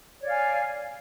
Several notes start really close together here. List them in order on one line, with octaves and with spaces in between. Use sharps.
C#5 D5 F5 G#5